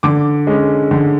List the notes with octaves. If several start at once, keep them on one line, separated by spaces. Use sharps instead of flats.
D3 D6
G#3 C#4
D3